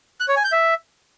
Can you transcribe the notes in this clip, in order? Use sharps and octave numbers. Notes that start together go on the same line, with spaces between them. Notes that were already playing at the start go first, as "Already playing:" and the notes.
F#6
C#5
G#5
G6
E5